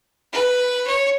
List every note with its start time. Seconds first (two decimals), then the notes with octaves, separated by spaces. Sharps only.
0.33 B4
0.87 C#5